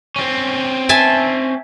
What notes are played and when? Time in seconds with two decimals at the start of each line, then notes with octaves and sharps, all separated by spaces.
0.16 C4 C#4
0.89 E5 G#5 A5